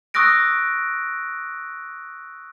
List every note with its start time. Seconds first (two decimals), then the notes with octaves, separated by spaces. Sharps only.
0.14 C#6 D#6 E6 F#6 A#6 D7